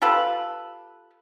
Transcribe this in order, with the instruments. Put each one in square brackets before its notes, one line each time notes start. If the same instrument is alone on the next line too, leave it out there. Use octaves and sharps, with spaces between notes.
[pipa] F4 G4 A4 B4